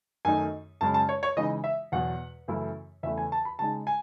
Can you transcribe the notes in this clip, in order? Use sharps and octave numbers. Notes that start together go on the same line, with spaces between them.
F#2 D#3 A3 D#4 G#5
F#2 C#3 G#3 C#4 A5
A5
C#5
C#5
C#3 E3 G#3 D#4 D#5
E5
E2 B2 F#3 F#5
F#2 C#3 E3 A3 E4
E2 C#3 E3 A3 E5
G#5
A5
B5
C#3 G#3 D#4 A5
G#5